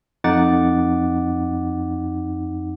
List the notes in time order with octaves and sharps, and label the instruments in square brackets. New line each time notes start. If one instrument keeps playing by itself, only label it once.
[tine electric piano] F2 D#4 F#5 D6 A6